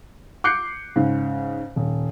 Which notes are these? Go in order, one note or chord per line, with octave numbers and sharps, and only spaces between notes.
D6 F#6 G6 C7 C#7
G#2 C#3
D#1